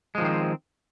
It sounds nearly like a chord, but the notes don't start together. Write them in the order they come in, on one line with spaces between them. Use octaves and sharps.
G#3 F3 D#3 C4